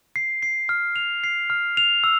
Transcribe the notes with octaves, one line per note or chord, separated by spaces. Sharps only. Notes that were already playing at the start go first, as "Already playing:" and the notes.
C7
C7
F6
F7
C7
F6
F7
E6